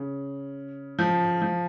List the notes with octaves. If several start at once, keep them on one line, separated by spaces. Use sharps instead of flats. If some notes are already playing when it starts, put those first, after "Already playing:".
Already playing: C#3
F3
F3